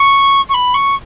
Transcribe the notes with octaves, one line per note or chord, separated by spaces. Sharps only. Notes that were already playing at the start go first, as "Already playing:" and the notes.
Already playing: C#6
C#6
B5
C#6